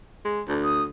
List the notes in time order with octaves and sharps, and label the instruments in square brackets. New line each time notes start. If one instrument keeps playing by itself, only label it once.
[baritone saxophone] G#3
D2
[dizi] D#6